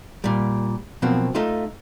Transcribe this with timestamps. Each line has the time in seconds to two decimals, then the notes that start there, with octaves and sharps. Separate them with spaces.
0.24 A#2 G3
1.02 B2 F3 F#3 A#3 C4
1.35 A3 D#4 F4